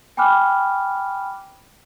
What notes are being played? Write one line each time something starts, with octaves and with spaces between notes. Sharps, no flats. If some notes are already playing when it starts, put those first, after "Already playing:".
G5 G#5 B5 D6 F6 F#6